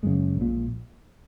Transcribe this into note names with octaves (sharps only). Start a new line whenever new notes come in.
F#1 F#2 C#3 G#3
A#1 A#2